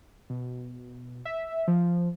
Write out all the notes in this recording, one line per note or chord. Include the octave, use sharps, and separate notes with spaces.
B2
E5
F3